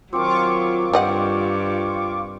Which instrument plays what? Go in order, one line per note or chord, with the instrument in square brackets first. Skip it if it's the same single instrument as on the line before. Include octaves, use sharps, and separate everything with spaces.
[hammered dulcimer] D#3 C4 [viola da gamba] F#3 [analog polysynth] F4 C#6 D6
[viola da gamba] G2 [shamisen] G3 D#5 F#5 [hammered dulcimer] G5